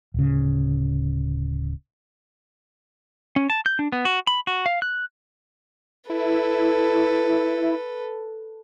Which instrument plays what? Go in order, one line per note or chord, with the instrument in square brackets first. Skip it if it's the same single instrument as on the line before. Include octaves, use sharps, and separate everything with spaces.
[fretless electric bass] D1 C#3
[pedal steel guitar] C#4
A5
G6
D4
B3
F#4
B5
F#4
F5
F#6
[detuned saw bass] E4 [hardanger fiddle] A4 B4